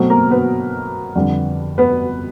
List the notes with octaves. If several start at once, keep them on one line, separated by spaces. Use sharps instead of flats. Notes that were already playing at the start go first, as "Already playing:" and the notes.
Already playing: B2 F#3 A3 C4
A#3 A#4
B3 B4
F2 D3 G3
B3 B4